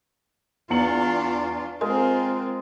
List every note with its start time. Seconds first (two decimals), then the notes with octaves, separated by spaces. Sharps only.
0.70 E2 D4 F4 C#7 F#7
1.81 G#3 C4 F4 A#4